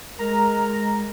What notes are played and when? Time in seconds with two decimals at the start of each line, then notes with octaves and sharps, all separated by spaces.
0.19 G#3 A#4 A#5